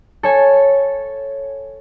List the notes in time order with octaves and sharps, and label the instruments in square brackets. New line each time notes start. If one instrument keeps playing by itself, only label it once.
[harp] A4 C#5 G#5